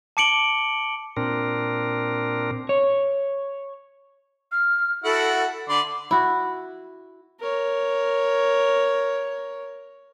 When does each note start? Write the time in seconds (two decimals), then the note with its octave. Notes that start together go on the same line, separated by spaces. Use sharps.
0.17 A5 D6 C#7 D7 F#7 G7
1.17 A#2 C4 D4 A#4
2.69 C#5
4.52 F6
5.04 E4 F#4 A4 F#5
5.69 D3 D5 B5 C6
6.11 E4 F#4
7.40 A#4 C#5